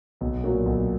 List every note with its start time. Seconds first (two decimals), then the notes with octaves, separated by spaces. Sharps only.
0.21 B1
0.43 A#2 F#3 A#3
0.66 B1